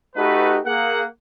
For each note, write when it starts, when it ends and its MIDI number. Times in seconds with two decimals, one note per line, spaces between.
0.16 0.57 57
0.16 0.57 63
0.16 0.57 66
0.16 0.57 67
0.16 0.57 71
0.65 1.02 58
0.65 1.02 68
0.65 1.02 78